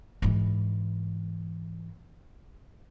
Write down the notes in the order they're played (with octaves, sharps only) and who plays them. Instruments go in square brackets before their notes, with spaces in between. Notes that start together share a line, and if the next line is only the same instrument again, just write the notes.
[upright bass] G#2 E3